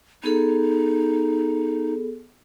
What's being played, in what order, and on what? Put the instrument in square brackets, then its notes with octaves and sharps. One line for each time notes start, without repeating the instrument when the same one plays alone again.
[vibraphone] B3 G#4 A4 [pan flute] D#4